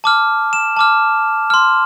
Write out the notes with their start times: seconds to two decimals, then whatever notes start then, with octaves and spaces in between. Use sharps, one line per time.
0.04 A5 D6 F6
0.53 E7
0.77 A5 D6 F6
1.50 C6 F6